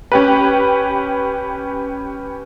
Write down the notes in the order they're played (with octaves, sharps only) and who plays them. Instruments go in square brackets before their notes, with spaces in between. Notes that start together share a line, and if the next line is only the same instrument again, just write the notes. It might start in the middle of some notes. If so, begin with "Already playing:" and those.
[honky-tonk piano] C#4 G4 B4